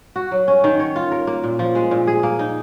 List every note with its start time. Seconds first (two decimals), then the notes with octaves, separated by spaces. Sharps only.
0.16 F#4
0.31 F#3
0.48 C#4
0.64 D#3
0.80 C#5
0.96 F4
1.12 A#4
1.27 A#3
1.44 A#2
1.59 F3
1.75 G#3
1.91 A#2
2.07 G#4
2.23 A#3
2.39 D#4